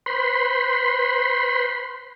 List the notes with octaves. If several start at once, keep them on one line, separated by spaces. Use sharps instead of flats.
B4 C5 B5 C6